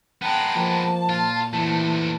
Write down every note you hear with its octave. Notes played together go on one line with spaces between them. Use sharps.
G#3 B3 F#5 G5 A5 A#5
F3 A#3
A#2 F4
C3 E3 A3